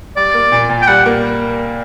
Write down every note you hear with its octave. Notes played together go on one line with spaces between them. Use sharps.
G3 D5
A#3
A#2
A#2
G5
G3 F#5
A#3